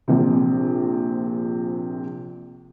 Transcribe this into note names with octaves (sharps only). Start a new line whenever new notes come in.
A#1 C3